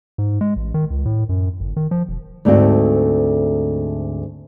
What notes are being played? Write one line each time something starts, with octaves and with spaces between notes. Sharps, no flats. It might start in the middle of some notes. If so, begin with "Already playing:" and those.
G#2
G#3
A1
D#3
C#2
A2
F#2
G1
D#3
F3
E1
D2 G#2 A3 C4 F#4